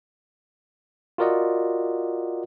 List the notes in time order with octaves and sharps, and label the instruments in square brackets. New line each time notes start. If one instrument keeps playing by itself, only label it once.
[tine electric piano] F4 F#4 A#4 D5 D#5 F#5